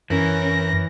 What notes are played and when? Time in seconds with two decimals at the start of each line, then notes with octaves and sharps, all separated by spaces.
0.10 F#2 E3 C#4 A#4 A#6